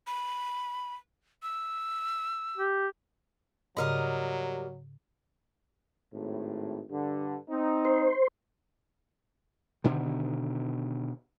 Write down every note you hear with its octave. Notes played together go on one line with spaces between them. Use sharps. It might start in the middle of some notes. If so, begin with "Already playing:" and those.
B5
E6
G4
G#2 C#3 F#3 G3 A#4 D#5
G#1 A2
G2 D3
C4 D#4
C5
B2 D3 D#3